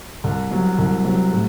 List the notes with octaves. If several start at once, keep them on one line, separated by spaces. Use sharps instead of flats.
C2
C3 F#3
C2
C3 F#3
A2